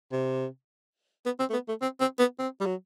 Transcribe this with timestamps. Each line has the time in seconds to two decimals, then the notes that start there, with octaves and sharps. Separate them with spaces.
0.12 C3
1.26 B3
1.39 C4
1.50 A3
1.53 B3
1.68 A3
1.82 C4
2.00 C4
2.19 B3
2.39 C4
2.60 G3
2.66 F#3